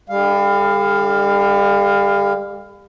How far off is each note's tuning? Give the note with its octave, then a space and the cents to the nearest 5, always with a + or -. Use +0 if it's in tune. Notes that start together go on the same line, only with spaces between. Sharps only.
D3 +0 G3 +40 F5 +0